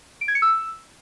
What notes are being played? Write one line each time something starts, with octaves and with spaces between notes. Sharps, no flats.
D7
G#6
C#7
E6